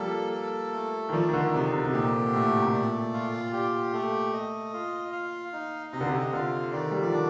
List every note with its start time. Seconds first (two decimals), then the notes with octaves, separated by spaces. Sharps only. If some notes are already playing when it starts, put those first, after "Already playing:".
Already playing: F3 G3 A#3 A4
0.33 A4
0.73 A3
1.09 D#3
1.13 F3 D5
1.29 D#3
1.33 D3
1.53 C3 D#4
1.73 C3
1.84 C3
1.93 A#2 G4
2.33 A2 A3
2.62 C3
2.73 A#2 D5
3.14 F4
3.53 G4
3.93 A3
4.33 D#5
4.73 F4
5.13 F5
5.53 D#4
5.93 C3 D#5
6.01 D3
6.07 C3
6.33 D3 F4
6.73 D#3 D5
6.91 G3
7.02 F3
7.13 D#3 D4